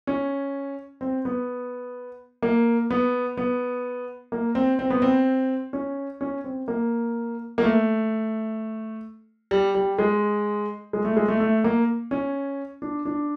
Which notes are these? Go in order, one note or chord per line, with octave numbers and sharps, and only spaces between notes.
C#4
C4
B3
A#3
B3
B3
A#3
C4
C4
B3
C4
C#4
C#4
C4
A#3
A#3
A3
G3
G3
G#3
G#3
A3
G#3
A3
A3
A#3
C#4
D4
D4